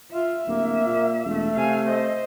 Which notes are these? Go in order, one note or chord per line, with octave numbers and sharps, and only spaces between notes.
F4 E5
D1 A#3
A#2
E1 A3
C3 F5 G#5
C5 D#5